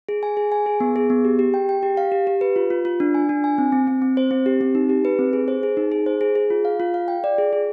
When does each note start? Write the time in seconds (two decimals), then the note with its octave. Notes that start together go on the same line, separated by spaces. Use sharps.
0.09 G#4
0.23 G#5
0.37 G#4
0.52 G#5
0.66 G#4
0.80 B3
0.96 G#4
1.10 B3
1.25 G4
1.39 G4
1.54 G5
1.69 G5
1.83 G4
1.97 F5
2.12 G4
2.27 G4
2.41 B4
2.56 F4
2.70 F4
2.85 F4
3.00 D4
3.14 G#5
3.29 D4
3.44 G#5
3.58 C4
3.72 C4
3.87 C4
4.02 C4
4.17 C5
4.31 C4
4.46 G4
4.61 C4
4.75 D#4
4.89 G4
5.05 B4
5.19 C4
5.33 G#4
5.48 C5
5.63 G#4
5.77 D#4
5.92 G#4
6.06 C5
6.21 G#4
6.35 G#4
6.50 F4
6.65 F5
6.80 F4
6.94 F5
7.08 G5
7.24 D5
7.38 G#4
7.53 G#4